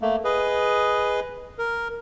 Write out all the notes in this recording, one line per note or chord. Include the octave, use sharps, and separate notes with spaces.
A3 A#3
G#4 B4 D#5
A#4